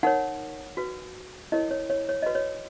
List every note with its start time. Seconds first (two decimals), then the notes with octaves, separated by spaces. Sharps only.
0.03 D#4 A#4 C#5 F#5
0.77 F#4 B4
1.52 E4 A#4 C#5 D#5
1.71 C#5
1.90 C#5
2.09 C#5
2.22 F#4 B4 D#5
2.35 C#5